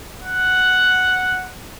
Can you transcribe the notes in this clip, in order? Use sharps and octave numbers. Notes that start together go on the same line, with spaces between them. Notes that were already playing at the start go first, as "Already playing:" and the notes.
F#5